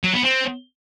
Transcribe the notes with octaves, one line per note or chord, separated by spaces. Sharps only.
F#3
B3
C4